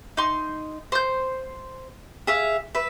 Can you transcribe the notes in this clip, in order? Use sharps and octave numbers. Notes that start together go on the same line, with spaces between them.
D#4 C6
C5 G6
G#4 E5 F5
B4 E5